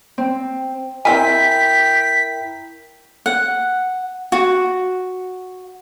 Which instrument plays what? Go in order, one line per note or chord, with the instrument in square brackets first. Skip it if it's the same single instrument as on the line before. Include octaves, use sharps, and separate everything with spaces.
[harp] C4
[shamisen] C4 G#5 [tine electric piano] E4 A#4 [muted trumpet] G5 [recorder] B6
[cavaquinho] F#5
F#4